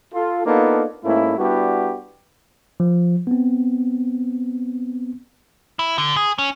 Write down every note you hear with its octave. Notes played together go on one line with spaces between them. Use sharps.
F4 A4
A#3 B3 D4 D#4 F4 A4
G#2 A3 A#3 C#4 E4
G3 B3 D4 E4 F#4 G4
F3
B3 C4
E4
D3
G#4
C#4